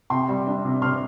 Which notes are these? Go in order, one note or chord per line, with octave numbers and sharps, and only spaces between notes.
C3 G5 C6
G3
D4
C3
C3 C6 F6